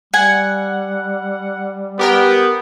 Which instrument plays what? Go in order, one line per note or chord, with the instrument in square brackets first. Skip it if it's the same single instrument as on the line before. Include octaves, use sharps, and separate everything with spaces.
[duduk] G3 [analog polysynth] F#5 [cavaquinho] G#5
[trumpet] B3 [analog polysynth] G4 A#4 G5